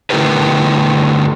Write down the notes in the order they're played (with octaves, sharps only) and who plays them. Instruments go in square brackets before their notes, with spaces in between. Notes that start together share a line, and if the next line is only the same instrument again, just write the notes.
[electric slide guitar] D3 A3 E4 G4 A#4 B4